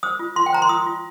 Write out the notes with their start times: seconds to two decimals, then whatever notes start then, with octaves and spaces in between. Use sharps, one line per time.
0.03 C5 D#6
0.19 F4
0.36 F4 C6
0.46 G5
0.52 C5 A#5
0.62 C6
0.69 F4 D#6
0.86 F4